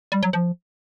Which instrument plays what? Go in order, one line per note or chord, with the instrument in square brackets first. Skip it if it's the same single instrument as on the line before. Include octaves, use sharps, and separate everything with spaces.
[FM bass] G3
F#3
F3